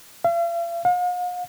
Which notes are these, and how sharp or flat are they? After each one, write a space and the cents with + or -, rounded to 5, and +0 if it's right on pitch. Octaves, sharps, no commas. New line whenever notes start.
F5 -45
F5 +45